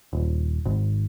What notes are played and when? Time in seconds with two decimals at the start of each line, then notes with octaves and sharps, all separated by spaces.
0.13 D#1
0.65 G#1